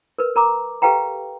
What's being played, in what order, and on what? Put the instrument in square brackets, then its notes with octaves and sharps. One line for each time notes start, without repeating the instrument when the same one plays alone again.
[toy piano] A#4 B4
A#4 A#5 D6
G4 A4 B4 F5 G5 A#5